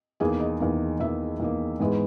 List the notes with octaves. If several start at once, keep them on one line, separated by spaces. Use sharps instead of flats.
E2 D#3 A#3 G#4
D#5
E2 D#3 A#3
E2 D#3 A#3 E5
E2 D#3 A#3
G#2 E3 G#3 B3